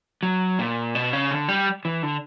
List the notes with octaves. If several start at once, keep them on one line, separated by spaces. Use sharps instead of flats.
F#3
A#2
B2
C#3
D3
G3
E3
D3